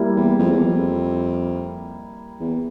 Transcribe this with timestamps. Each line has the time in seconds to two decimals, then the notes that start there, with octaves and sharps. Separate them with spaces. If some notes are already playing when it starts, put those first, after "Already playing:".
Already playing: G3 A#3 E4 G4
0.16 E2
0.39 F2
0.52 E2
0.65 F2
2.40 E2